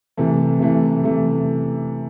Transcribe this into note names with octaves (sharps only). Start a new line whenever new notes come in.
C3 E3 A3
C3 E3 A3
C3 E3 A3